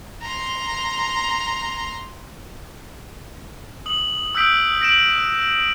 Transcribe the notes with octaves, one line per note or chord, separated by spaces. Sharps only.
A#5 C6
D#6 F#7
D#6 E6 F#6 G6 B6 D7
A#6 D7 E7 F#7